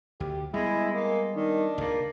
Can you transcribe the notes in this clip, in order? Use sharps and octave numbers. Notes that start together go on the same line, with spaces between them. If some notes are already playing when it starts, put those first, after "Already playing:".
D2 G4
G3 G#3 B3 E4
G#3 A#3
D#3 D4
C#2 G2 A#3